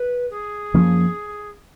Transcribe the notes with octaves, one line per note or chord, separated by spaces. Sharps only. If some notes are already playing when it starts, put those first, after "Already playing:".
Already playing: B4
G#4
F#2 F3 A#3 C#4